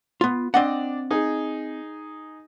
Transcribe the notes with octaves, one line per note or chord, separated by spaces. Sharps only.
B3 F4
C4 D4 D5 D#5 F#5
D#4 G#4